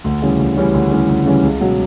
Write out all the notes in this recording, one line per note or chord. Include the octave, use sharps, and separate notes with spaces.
D2
C#3 E3 G3 C#4
D2
C#3 E3 G3 C#4
D2
C#3 E3 G3 C#4
D2
C#3 E3 G3 C#4
C#2
B2 F#3